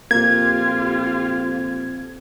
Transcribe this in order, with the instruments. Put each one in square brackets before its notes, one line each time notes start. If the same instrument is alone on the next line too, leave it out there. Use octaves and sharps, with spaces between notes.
[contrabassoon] F2 [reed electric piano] A#2 A#3 [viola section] F4 G4 [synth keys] G#6